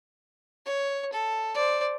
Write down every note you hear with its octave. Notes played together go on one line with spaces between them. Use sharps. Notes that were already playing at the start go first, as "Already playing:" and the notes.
C#5
A4
C5 D5